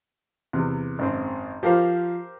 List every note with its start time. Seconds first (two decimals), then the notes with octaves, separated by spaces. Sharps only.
0.53 E2 C3
0.99 G#1 F#2 C4
1.63 F3 G4 A#4 C5 F5